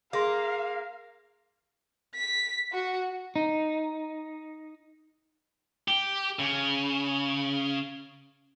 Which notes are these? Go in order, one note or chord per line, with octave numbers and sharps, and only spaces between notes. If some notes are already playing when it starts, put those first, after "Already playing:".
A#3 G#4 F5 C6
B6
F#4
D#4
G4
C#3